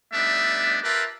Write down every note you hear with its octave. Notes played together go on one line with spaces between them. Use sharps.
G3 A3 B3 D4 D#4 E5
F4 G4 A#4 B4 E5 A5